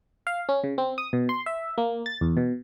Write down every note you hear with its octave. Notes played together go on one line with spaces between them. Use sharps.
F5
C#4
C#3
C4
D#6
B2
C6
E5
A#3
A6
E2
B2